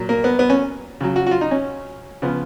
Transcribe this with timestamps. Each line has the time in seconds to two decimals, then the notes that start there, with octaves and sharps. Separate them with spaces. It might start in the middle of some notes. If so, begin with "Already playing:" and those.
Already playing: A#2 F#3
0.09 A#3
0.24 B3
0.39 B3
0.50 C#4
1.01 C#3 F#3
1.16 F#4
1.27 F#4
1.31 F4
1.41 D#4
1.51 C#4
2.22 C#3 F3 B3